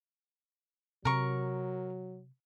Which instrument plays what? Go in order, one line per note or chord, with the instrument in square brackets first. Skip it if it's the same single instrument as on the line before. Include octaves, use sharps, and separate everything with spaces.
[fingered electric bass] C3 [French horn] F#3 [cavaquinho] A#4 C#6